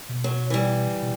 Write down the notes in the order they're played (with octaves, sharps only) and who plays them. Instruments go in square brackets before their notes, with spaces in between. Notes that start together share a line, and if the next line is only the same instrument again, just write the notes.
[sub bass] B2
[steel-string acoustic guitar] F#3
E3 G3
[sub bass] B2